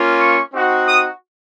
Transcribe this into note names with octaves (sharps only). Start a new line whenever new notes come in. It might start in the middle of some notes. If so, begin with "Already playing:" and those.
Already playing: A#3 C#4 F4
C#6
C4 D#4 F#4
D#6